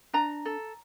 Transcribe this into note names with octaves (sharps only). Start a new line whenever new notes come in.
D4 A#5
A4